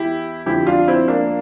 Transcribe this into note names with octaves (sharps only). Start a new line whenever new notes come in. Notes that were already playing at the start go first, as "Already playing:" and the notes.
Already playing: E2 E3 E4 G4
F2 D3 F3 E4 G4
D4 F4
C4 E4
A#3 D4